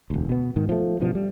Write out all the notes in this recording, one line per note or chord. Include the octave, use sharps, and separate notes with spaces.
E1 D2
B2 B3
G#2 D#3
F3 A3
A1 G2 B2 F3
G3